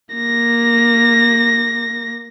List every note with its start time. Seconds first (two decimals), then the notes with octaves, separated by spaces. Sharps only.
0.15 A#3 A#6